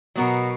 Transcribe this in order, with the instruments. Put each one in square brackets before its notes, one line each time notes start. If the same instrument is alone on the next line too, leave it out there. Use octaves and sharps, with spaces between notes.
[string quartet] B2 [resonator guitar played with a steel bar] F#3 B3 F#4 A#4